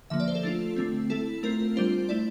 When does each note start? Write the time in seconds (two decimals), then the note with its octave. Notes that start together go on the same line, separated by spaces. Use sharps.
0.10 D3 F3 A#3 E5
0.20 D5
0.28 C5
0.35 A4
0.43 A3 D4 F4
0.76 D3 A3 C4
1.10 A3 E4 A4
1.43 A3 C4 F4 A#4
1.76 G3 D4 F4 C5
2.09 A3 E4 D5